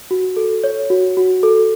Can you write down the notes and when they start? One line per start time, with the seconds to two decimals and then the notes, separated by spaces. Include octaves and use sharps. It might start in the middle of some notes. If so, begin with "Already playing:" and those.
0.11 F#4
0.36 A4
0.64 C#5
0.90 F#4
1.17 F#4
1.43 A4